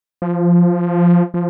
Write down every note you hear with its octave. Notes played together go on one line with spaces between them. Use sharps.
F3
F3